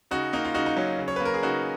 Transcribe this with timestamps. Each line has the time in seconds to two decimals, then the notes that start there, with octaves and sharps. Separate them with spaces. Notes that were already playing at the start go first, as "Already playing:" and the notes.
0.11 C#3 D#4 F#4
0.33 A#3 D#4
0.45 F4
0.54 C#3 D#4 F#4
0.66 D#4
0.77 F#3 C#4
0.98 C#3
1.08 C#5
1.16 B4
1.20 A#3
1.25 A#4
1.34 G#4
1.43 C#3 D#4 F#4